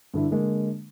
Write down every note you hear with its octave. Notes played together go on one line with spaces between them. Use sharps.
G2 D3 E4
D3 G#3 A#3